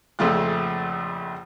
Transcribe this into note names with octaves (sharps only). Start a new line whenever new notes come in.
A#1 F2 C#3 A3 F4 F#6